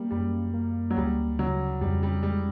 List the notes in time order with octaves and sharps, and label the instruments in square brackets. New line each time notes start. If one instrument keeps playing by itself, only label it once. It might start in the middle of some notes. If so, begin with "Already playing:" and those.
Already playing: [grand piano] G3 [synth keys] A#3
[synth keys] F#2 [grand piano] G3
[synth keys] A#3
[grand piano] F#3
[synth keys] D2 [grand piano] G3
[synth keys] C#3 [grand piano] F#3
[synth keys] F2 [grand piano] G3
[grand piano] G3
[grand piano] G3 [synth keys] G#3